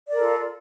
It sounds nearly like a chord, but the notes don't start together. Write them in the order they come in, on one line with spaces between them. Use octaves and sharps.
D5 A#4 A4 F4